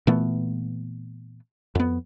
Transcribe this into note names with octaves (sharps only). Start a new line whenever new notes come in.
A#2 E3 A3 B3
F2 B3